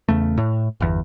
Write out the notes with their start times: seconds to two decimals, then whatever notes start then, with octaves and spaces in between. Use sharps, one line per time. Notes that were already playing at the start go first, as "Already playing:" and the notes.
0.09 E2 C#3 A3
0.38 A2
0.81 G1 E2